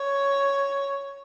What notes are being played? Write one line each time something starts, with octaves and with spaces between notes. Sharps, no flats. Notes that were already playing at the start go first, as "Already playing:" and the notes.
Already playing: C#5